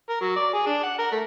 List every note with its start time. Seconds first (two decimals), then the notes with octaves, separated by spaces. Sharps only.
0.09 A#4
0.21 F#3
0.36 D5
0.53 G#4
0.66 D4
0.83 F#5
0.99 A#4
1.12 A3